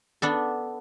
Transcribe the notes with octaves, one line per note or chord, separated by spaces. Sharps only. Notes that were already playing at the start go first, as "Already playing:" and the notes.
B3 D4 A4